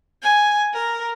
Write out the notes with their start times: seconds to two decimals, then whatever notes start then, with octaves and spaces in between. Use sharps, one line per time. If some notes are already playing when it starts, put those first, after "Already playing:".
0.22 G#5
0.74 A#4